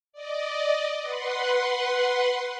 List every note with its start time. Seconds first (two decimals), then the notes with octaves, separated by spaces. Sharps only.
0.13 D5 D#5
1.02 B4 F#5 C6